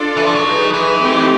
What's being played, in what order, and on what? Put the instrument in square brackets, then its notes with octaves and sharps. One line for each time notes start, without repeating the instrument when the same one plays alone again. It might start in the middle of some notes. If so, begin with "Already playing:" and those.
Already playing: [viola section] D4 F4 A4 D5
[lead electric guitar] E3
F3
F#3
[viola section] D#4 G#4 B4
[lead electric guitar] E3
[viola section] A3 C4 D#4 G4